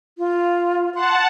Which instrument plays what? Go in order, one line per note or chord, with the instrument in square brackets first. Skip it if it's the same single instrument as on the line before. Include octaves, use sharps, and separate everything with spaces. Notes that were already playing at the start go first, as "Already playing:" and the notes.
[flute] F4
[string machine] F#5 A5 [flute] C6